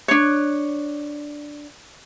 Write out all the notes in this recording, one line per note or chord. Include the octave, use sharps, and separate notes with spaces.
D4 C#5